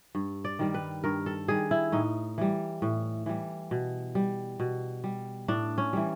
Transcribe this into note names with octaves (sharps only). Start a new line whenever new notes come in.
G2
D5
D#3 G3
B4
G2 A#4
A4
D#3 G3 G#4
E4
A2 D#4
E3 G3
A2
E3 G3
B2
G3
B2
G3
A2 D4
C#4
E3 G3